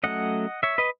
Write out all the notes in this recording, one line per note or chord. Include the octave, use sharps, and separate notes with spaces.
F#3 A3 C#4 D#5 F#5
C#5 E5
B4 D#5